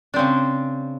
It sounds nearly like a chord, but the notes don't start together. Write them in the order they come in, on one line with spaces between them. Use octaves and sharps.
D4 C4 C#3